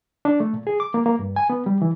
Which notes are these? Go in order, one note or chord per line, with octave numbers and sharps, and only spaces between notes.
D4
A3
A#2
G#4
D6
A#3
A#3
G2
G#5
B3
G3
E3